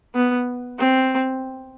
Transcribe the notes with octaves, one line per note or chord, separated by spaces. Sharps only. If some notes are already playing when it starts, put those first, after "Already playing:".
B3
C4